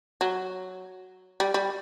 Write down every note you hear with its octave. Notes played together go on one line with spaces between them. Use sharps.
F#3
G3
G3